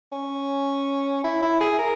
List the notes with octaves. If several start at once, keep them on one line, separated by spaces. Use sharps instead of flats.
C#4
E4
E4
G#4
A#4